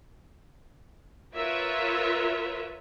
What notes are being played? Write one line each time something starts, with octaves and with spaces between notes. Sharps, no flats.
F4 A#4 B4 C#5 E5